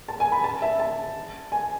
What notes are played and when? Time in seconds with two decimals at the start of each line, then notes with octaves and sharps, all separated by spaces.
0.08 A5
0.20 G#5
0.32 B5
0.44 A5
0.62 E5
0.80 A5
1.52 G#5